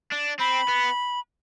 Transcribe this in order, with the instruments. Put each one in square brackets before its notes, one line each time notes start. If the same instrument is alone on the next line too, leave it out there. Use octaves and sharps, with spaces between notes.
[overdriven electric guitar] D4
[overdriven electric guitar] C4 [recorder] B5
[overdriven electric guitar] B3